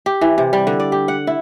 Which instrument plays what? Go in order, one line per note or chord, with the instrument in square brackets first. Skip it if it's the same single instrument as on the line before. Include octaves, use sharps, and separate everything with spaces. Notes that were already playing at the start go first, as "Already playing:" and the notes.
[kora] G4
E3
C3
G3
D3
D5
G4
F#5
E4